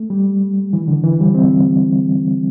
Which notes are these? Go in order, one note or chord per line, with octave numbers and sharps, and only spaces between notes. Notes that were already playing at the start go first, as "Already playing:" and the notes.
Already playing: A3
G3
E3
D3
E3
G3
C4